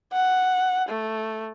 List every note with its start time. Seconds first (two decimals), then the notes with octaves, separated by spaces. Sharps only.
0.13 F#5
0.89 A3